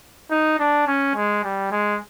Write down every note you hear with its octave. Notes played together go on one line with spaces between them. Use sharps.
D#4
D4
C#4
G#3
G3
G#3